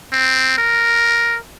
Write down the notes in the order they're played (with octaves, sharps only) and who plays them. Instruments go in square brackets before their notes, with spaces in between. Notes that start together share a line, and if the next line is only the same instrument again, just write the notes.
[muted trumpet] C4
A#4